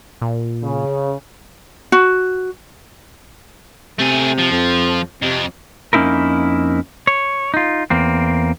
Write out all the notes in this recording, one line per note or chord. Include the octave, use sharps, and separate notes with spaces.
A#2
C#3
F#4
C3 A3 G#4
F3
F2
F2 C3
F2 A#3 C#4 D#4 E4 A#4
C#5
D#4 F4
E2 A#3 C4